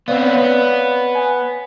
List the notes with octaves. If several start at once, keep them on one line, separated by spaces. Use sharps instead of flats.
B3 C4 C#5 D5 F5
B3
G#5